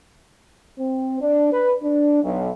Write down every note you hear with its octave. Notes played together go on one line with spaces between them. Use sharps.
C4
D4
B4
D4
B1